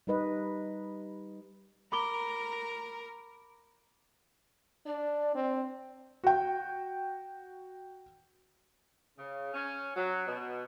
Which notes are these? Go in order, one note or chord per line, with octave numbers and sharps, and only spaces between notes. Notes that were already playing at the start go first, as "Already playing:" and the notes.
G3 D#4 B4 D#5
A#4 A#5 B5 D6 G7
D4 D5
C4
F#4 G5
C#3
C#4
F#3
B2